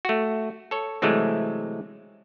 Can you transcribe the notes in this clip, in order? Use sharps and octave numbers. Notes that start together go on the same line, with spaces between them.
A3 F#4
A4 C#5
C3 E3 F#3 G#3 A3